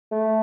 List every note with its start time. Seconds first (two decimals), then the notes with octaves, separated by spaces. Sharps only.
0.12 A3